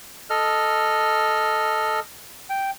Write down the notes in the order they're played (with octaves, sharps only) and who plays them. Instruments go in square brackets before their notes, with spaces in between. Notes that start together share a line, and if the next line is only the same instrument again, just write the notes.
[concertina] A4 D#5 F6
G5